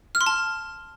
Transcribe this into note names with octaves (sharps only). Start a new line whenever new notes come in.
F6
C6
A5